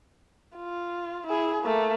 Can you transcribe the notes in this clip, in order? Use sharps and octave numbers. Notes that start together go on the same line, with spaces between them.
F4
E4 G#4
A3 A#3